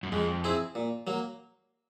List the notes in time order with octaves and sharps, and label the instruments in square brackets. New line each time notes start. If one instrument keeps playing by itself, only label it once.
[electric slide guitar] F#2
[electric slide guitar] F2 [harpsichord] G#3
[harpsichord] C4 E4 G#4
A#2
F#3 A#3